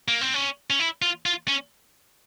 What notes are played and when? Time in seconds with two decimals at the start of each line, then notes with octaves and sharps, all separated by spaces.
0.08 A#3
0.21 C4
0.34 C#4
0.70 C#4
0.80 E4
1.02 F4
1.26 F4
1.48 C#4